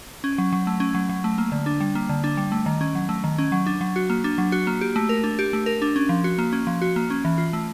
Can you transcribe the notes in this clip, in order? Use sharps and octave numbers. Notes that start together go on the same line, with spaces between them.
C#4
F#3
F#3
A3
C#4
F#3
F#3
A3
A#3
D3
D4
G3
A#3
D3
D4
G3
A3
D#3
C#4
F#3
A3
D#3
C#4
F#3
D4
F#3
F#4
A#3
D4
F#3
F#4
A#3
G4
A3
A#4
D4
G4
A3
A#4
D4
C#4
F3
F#4
A#3
C#4
F3
F#4
A#3
C#4
E3
F4
A3